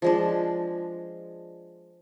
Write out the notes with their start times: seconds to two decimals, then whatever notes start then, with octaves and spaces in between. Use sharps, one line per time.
0.02 F3 G#3 D4